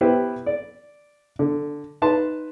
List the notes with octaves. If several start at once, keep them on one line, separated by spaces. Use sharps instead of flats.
B3 E4 G4 B4 C5
D5
D3
D#4 B4 A5 C6